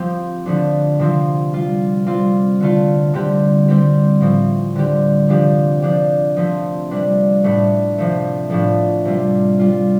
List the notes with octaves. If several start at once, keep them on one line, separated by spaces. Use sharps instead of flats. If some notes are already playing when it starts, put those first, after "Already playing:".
Already playing: F3 C4 G4
D3 F3 A3 D4
C3 F3 C4
G3 F4
G3 C4 F4
D3 A3 F4
D3 G3 C4 G4
G3 C4 G4
A2 F3 C4
D3 G3 C4 G4
C3 F3 D4 G4
F3 D4 G4
F3 A3 C4
C3 G3 D4
A2 A3 D4
C3 F3 A3
A2 F3 A3 D4
C3 G3 F4
G3 F4